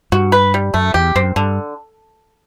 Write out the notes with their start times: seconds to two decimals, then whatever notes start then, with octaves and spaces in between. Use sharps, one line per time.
0.12 G2 F#4
0.32 B4
0.54 G3
0.74 F#2 A3
0.94 E2 G4
1.15 F#2 C4
1.36 G2 D3